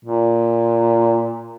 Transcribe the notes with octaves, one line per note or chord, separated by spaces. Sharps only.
A#2